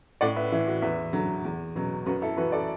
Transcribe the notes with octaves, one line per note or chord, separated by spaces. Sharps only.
A2 D5 F#5
B4 E5
E3 E4
F#4
E2 B4 E5
D3 F#3
E2
B2 F#3
F#2 F#4 B4
E4 A4
E3 F#4 B4
A4 D5